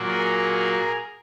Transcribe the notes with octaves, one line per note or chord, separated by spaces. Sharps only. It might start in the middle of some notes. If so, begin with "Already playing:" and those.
Already playing: A#2 F#3 A#3
G#4 A#4